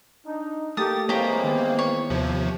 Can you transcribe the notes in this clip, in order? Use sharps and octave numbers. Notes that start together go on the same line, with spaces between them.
D4 D#4
A3 A#3 G4 A4 D#6 A6
E3 G#3 A#3 C4 G4 C#5 A#5
D#3 B3
C#5
D#2 C3 F3